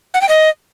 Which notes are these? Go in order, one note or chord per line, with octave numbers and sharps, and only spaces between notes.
F#5
G5
D#5